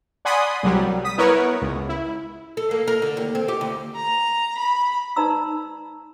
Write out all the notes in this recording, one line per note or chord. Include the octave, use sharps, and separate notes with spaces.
D5 F#5 G#5 B5 C6 D#6
C2 F#3 G3
D#6 B6
B3 E4 A#4 B4 C#5
C#2
E4
A4
A#3
A#4
D3
D#2
C4
G4
D2
A#5
B5
D#4 B4 D5 A#5 B5 E6